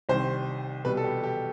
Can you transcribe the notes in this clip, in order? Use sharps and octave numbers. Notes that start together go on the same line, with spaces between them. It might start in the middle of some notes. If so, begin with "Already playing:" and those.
C2 C3 D#3 G3 C5
C2 B2 G3 B4
A4
G4
G4